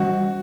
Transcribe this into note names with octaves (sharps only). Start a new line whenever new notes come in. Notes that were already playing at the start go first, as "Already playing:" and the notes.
Already playing: E3 G3 C#4 F#4